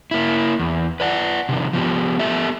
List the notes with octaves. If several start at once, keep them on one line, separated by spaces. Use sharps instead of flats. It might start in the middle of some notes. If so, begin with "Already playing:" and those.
A#3 E4
E2
B4 D5 F#5
C3 D#3 F3
F3 B3 G4
B3 G4 A4 E5